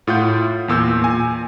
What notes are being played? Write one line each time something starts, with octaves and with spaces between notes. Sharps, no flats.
A2 F4 F#5 G6
E2 A#2 E6 G6
A#2 G#5